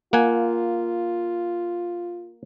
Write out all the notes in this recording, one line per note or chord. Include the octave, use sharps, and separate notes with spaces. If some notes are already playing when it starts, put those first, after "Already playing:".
A#3 F4 F#5 G#5